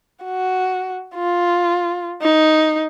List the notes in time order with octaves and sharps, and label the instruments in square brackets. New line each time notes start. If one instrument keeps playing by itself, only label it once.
[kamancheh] F#4
F4
D#4